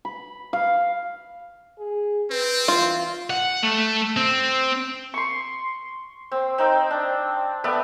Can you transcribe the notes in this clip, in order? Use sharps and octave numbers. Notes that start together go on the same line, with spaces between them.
B5
F5
G#4
C4 B4
E3 F4
F#5
A3
C4
C6 C#6
C4
C4 D#4 G5
D4
A3 B3 D5 E5